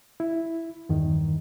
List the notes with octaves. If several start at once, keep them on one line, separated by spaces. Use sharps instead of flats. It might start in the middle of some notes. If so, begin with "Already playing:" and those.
E4
E2 G2 D#3